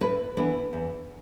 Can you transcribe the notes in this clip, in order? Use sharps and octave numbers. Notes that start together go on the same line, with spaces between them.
A2 B4
E3 B3 D4 B4
E2